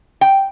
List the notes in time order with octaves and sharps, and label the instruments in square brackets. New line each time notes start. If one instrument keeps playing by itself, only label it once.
[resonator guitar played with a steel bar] G5